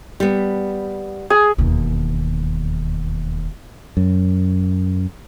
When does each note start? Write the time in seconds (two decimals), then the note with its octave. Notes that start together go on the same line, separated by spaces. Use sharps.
0.20 G3 B3
1.30 G#4
1.58 E1 D#2
3.97 F#2